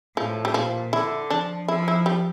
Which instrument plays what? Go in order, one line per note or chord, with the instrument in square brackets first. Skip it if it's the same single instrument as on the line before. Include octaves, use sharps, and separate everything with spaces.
[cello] A2 [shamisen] F3
[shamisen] G3
[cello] A#2 [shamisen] F3
[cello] D3 [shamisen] E4
[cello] F3 [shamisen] D4
[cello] F3 [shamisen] E4
[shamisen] E4
G3